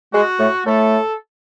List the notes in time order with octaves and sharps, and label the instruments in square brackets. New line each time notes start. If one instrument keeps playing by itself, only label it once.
[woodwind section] G#3 [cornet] F#4
[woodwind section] A2 A3
[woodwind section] A2 A3 [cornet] A4